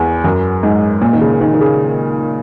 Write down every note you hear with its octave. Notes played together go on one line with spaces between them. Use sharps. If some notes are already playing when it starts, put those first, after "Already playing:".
Already playing: E2
F#2
G#2
A#2
D#3
C#3
D#3
D#3
C#3